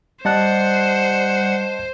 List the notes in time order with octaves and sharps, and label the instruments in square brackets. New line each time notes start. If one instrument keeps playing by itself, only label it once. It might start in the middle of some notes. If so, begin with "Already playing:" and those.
[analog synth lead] G3 [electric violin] C5 [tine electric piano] D#5 A5 F#6 [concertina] F#5